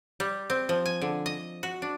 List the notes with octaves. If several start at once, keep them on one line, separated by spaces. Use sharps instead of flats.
G3
C4
F3
G#5
D3
D#5
F#4
D4